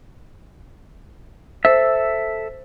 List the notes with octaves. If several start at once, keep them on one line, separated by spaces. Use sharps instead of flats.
A4 C5 E5